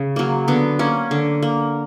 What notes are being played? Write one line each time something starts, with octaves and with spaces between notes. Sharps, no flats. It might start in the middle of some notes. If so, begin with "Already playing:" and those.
Already playing: C#3
F#3 A#3
D3 B3
A#3 C#4
D3
A#3